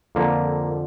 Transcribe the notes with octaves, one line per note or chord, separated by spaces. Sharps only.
F2 D3 F3 A#3